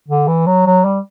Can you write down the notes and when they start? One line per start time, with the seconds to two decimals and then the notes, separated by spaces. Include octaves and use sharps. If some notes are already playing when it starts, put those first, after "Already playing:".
0.08 D3
0.28 E3
0.46 F#3
0.66 F#3
0.85 G3